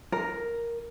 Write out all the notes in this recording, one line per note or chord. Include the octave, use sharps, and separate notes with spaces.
A#4